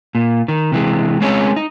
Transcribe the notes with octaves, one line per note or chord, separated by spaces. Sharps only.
A#2
D#3
C3 E3 G#3
G#3 C4 C#4 G#4 B4 C#5
D#4